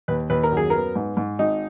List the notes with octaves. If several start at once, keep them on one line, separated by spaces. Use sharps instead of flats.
D#2 B4
D#2 B4
A#4
F#2
G#4
B3 A#4
G#2
G#2
G#1 D#4